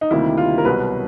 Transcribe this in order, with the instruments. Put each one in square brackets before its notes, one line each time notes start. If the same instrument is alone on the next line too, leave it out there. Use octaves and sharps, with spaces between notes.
[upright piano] D#4
D2 C3 D#3 G3 A#3 E4
F4
A#4
C2 B2 F#3 B4